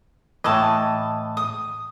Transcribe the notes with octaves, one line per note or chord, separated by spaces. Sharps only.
A2 E3 D#5 A5
D#6